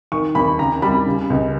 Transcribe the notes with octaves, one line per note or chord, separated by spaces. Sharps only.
D#3 C#6
D#2 B5
C#3 A#5
G3 B5
C#3
C#2